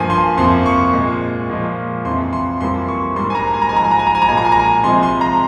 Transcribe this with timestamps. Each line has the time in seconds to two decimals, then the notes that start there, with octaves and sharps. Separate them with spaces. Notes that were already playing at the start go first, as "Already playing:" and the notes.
Already playing: G2 F3 A#3 G#5
0.10 C6
0.38 F2 C3 F3 A#3 C6
0.66 C#6
0.93 A#2 G#3
1.50 A#2 F3 G#3
2.05 F2 C3 E3 C6
2.33 C6
2.61 F2 E3 G3 A#3 C6
2.88 C#6
3.16 G#2 G3 A#3 C6
3.30 G#5
3.35 A#5
3.54 G#5
3.62 A#5
3.69 G#5
3.72 G#2 F3 G#3 A#5
3.84 G#5
3.91 A#5
3.99 G#5
4.07 A#5
4.15 G#5
4.22 A#5
4.28 A#2 F3 G#3 G#5
4.37 A#5
4.45 G#5
4.52 A#5
4.59 G#5
4.84 C3 F3 G#3 C6
5.03 C6
5.21 A#5